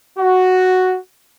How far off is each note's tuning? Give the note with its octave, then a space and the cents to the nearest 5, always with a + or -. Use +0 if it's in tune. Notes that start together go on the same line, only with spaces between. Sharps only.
F#4 +0